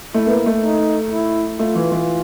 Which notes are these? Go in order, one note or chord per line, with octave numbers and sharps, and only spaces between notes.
A3 E4
B3
A#3
A3
D#4
E4
A3 F4
E3
E3